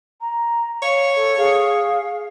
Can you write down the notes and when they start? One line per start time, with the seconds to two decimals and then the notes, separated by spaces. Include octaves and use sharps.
0.21 A#5
0.82 C#5 F5
1.16 A4
1.38 G#4 F5